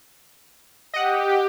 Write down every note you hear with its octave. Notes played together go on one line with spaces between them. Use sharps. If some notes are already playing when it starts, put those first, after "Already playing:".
G4 D#5 F#5